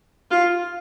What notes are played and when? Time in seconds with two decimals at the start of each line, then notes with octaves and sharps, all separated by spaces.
0.31 F4